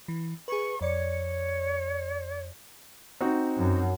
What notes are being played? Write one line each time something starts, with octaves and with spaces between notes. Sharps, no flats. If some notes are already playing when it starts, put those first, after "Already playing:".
E3
G#4 B4 C#6
F2 C#5 D5 C#7
C4 D#4 F#4
F#2